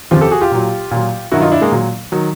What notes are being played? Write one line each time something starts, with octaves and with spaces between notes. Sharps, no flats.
F2 C#3 F3 F4 G4
G4 A4
F#4 G#4
F4 G4
A#2 F#3
A#2 F#3
G2 D#3 F#3 E4 F#4
D#4 F4
D4 E4
G#3 A#3
A#2 F#3
D#3 F#3